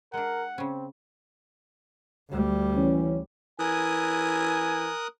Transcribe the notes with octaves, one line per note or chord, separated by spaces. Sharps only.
G#3 D4 A#4 F#5
C#3 C4 C#4
D2 G3
E3 C#4
E3 A#4 G#5 D#6 F#6